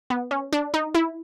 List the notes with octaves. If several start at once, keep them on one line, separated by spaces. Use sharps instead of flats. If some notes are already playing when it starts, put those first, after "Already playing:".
B3
C#4
D4
D#4
E4